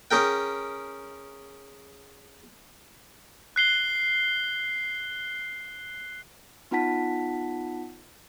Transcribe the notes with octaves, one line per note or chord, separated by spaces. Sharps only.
C#4 G#4 A#4 G5
F#6 C7 G7
B3 D#4 F4 F#5 A5 B6